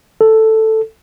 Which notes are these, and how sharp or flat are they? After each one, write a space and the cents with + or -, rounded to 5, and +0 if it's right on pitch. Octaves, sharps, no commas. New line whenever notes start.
A4 +5